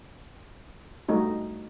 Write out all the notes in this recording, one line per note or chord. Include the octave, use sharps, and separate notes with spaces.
G3 A3 D#4 F#4